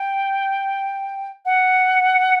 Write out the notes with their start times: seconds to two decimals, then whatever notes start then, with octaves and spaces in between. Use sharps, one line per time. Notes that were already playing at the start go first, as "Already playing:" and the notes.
Already playing: G5
1.45 F#5